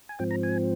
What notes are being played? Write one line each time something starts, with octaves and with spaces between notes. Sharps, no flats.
G#5
G#2 F3 C4 G5
A#5
G#5